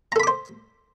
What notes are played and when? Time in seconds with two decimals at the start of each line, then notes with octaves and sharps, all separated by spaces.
0.12 A#5
0.16 A4
0.20 B5
0.23 D6
0.27 C5